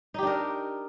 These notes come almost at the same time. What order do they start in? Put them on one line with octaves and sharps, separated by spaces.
D#4 G4 D4 A#4